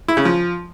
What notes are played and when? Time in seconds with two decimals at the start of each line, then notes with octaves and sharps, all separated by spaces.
0.08 E4
0.17 C#3
0.25 F3